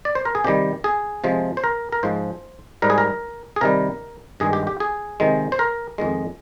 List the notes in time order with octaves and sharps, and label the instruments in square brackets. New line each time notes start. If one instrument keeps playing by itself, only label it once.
[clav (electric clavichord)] D5
C5
A#4
G#4
C3 D#3 G3 G4
G#4
C3 F3 G#3
C5
A#4
A#4
G#2 F3 G#3 C5
G#2 G3 A#4
G#4
A#4
G#4
C3 D#3 G3 A#4
G2 D#3 G#3 G#4
G4
G4
G#4
C3 D#3 G#3
C5
A#4
F2 D#3 G#3